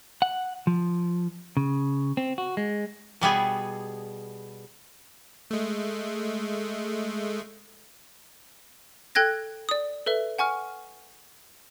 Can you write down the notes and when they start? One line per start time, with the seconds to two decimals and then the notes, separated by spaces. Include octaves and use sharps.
0.22 F#5
0.67 F3
1.57 C#3
2.17 C4
2.38 F#4
2.57 G#3
3.21 B2 G3 B3 G#4
5.51 G#3 A3
9.15 A4 G5 F#6 G#6 A#6
9.69 D5 D#6
10.06 A4 B4 E5
10.38 F#5 G#5 C#6 F6